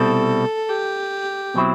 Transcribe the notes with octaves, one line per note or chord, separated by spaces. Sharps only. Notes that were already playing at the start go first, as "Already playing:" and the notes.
Already playing: C2 B2 G3 C4 E4 A4
G4
B2 F#3 C4 E4